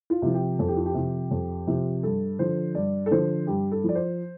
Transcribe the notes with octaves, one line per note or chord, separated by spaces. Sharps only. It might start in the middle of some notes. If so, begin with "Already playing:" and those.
F4
C3 F3
G4
F2 A4
G4
F4
G4
C3 F3
F2
C3 F3
G2 A4
D3 F3 C5
G2 D5
A4
D3 F3 C5
G2 G4
A4
F3 D5
C5